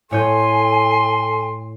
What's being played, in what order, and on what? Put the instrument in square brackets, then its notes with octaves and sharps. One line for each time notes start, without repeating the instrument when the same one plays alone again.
[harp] A2 C#5 G6 [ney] A4 [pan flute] G#5 [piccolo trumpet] C6